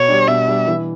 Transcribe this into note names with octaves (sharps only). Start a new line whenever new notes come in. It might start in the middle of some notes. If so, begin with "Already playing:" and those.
Already playing: B2 C#5
G3 D4
B2 E5
G3 D4
E3